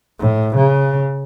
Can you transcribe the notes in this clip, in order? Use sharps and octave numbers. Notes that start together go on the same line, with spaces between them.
A2
C#3